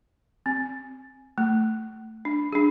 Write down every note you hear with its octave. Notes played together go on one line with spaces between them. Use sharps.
C4
A3
D4
D4 G#4